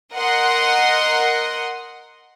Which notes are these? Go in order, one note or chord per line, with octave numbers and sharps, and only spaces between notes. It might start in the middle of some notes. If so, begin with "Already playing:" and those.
A#4 D#5 F#5 C6